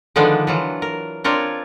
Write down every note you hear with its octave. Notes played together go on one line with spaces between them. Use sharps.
D3 D#3 F3 G#3 B3 D4
E3 F#3 F4
A#4
C4 D4 F4 A#4 C#5